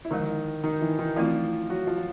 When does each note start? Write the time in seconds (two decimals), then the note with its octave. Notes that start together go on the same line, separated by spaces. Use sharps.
0.05 E4
0.11 D3 D#3 F3 G#3 D#4
0.64 D#3 D#4
0.81 E3 E4
0.99 D#3 D#4
1.16 E3 F3 A3 C4 E4 F4
1.69 F#3 F#4
1.87 F3 F4
1.97 F4